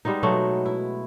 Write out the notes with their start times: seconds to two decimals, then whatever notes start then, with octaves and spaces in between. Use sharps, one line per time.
0.05 G3 G#3 B3 D#4
0.23 B2 F#3 G#3 A3
0.66 E4